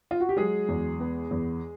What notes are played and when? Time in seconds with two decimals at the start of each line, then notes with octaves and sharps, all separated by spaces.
0.11 F4
0.20 F#4
0.29 G4
0.36 F#3 G#3 G#4
0.69 E2
1.00 B3
1.31 E2